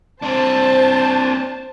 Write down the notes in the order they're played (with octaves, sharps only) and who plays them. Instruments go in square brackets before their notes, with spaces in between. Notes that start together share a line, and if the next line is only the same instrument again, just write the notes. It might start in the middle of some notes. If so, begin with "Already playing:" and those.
[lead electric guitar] C4 D4 [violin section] C5 A5